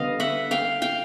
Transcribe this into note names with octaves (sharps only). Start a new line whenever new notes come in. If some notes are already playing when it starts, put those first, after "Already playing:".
Already playing: D3 G3 B3 D#5 F5
E5 F#5
F5 G5
F5 G5